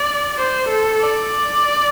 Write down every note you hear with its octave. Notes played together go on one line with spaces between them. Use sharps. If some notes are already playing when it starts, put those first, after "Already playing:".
Already playing: D5
C5
A4
D5